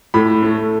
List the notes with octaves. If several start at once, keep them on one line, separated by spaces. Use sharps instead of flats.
A2 B5
A3